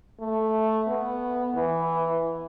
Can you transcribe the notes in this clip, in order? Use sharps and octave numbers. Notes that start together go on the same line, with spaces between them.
A3
B3
E3